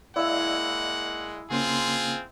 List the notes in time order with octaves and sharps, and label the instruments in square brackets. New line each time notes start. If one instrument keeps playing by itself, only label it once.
[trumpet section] G#3 A#3 F#5 [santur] E4 E6 [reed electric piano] D5 D#5 F5
[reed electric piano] C#3 A#3 C#4 [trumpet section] C4 F4 G#4